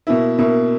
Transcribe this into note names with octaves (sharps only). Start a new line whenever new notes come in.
B2 A#3 E4
B2 A#3 E4